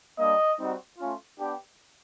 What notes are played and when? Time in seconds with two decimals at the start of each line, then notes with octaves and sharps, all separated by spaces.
0.18 G3 A#3 D4 D#5
0.59 G3 C4 D#4 F#4
0.99 A3 C#4 F4
1.39 B3 D4 G4